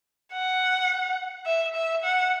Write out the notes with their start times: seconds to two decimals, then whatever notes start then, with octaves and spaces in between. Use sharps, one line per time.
0.33 F#5
1.46 E5
1.76 E5
2.04 F#5